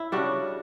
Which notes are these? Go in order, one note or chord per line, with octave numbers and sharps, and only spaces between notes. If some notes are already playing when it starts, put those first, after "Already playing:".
Already playing: E4
C#3 G3 D4 F#4